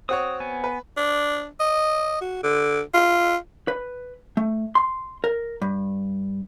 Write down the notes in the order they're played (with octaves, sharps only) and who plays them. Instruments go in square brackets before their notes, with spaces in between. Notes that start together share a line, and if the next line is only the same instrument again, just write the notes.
[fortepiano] C4 F#4 C#5 [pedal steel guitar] D#6
[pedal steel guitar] B3 G#5
[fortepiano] B4
[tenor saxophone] D4
D#5
F#4
D3
F4
[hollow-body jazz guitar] B4
A3
C6
A#4
G2